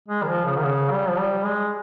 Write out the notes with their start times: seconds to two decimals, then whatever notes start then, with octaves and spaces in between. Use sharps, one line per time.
0.09 G#3
0.23 D#3
0.27 F3
0.45 C#3
0.57 D#3
0.64 C#3
0.91 G3
1.08 F3
1.18 G3
1.45 G#3